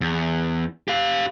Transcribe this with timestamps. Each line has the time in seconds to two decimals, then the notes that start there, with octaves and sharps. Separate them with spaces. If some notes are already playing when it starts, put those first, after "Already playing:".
0.01 E2
0.88 G4 F5